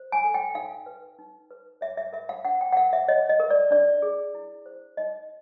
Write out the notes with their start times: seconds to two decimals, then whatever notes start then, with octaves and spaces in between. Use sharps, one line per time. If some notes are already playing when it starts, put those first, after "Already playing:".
Already playing: C5
0.12 G#5
0.24 A4
0.34 G5
0.55 D#4 F5
0.86 B4
1.19 D#4
1.51 B4
1.81 C#5 E5
1.97 E5
2.13 A#4 E5
2.29 F5
2.45 D4 F#5
2.61 G5
2.72 F#5
2.77 A#4 F5
2.93 E5
3.08 C#5 D#5
3.29 D#5
3.40 A#4
3.50 D5
3.71 D4 D5
4.02 G#4
4.35 E4
4.66 C5
4.97 D#4 D#5